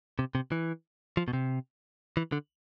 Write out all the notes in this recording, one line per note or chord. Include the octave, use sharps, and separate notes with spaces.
C3
C3
E3
F3
B2
C3
E3
D3